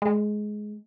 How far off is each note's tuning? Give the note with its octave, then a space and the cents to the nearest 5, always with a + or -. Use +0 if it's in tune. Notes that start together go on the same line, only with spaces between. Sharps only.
G#3 +15